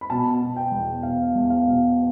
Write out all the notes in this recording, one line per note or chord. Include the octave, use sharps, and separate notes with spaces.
B5
B2 A5
B2
G5
E2
B2 F5
E2
F5
B2